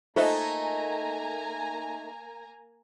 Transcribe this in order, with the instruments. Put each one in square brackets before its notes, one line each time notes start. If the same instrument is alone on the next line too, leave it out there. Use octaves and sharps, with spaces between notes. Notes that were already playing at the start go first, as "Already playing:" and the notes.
[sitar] A3 D#4 [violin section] A#3 G#5 A#5 [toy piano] F4 C5 E5